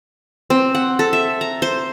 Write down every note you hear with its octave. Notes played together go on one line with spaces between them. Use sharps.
C4
F#5
A4
E5
A#5
C5